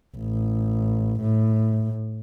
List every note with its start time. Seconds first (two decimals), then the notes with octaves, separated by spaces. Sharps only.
0.17 A1
1.21 A2